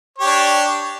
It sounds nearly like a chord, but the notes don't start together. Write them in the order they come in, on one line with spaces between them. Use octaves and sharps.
C#5 G4 D4